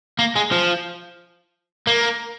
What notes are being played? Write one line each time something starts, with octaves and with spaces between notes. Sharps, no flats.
A#3
G#3
F3
A#3